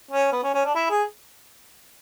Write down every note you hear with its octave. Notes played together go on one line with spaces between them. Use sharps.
C#4
B3
C#4
C#4
D4
E4
G#4